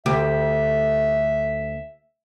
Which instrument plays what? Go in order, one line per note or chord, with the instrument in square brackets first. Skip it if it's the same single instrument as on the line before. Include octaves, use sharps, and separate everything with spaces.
[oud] D2 G4 [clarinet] E5